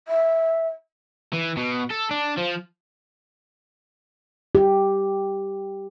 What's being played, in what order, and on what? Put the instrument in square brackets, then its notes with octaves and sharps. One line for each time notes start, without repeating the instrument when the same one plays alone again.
[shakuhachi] E5
[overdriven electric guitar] E3
B2
A4
D4
F3
[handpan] G4